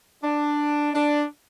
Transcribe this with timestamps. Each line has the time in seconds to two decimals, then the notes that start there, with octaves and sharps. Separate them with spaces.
0.23 D4
0.94 D4